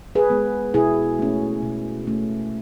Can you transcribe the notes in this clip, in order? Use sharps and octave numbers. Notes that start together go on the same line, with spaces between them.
G#4 B4
G#3 B3
B2 E4 G#4
A3 C#4
B2
A3 C#4